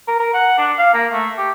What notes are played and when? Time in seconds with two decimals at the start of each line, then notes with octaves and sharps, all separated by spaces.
0.08 A#4
0.20 A#4
0.34 F#5
0.58 D4
0.78 F5
0.94 A#3
1.13 A3
1.38 G4